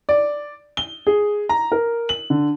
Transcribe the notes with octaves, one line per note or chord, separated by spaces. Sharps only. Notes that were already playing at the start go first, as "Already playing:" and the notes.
D5
G7
G#4
A#5
A#4
F#7
D3